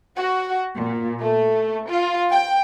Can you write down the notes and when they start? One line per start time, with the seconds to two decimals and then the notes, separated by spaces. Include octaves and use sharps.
0.17 F#4
0.78 A#2
1.21 A3
1.88 F4
2.32 G5